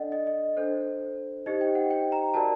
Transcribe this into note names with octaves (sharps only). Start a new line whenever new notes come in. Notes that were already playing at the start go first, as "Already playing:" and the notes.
Already playing: D4 A4 D5 D#5 F#5
D#5
D#5
D4 A4 C5
D#4 G4 C5 D#5
G5
F#5
G5
A#5
F#4 A#4 D5 A5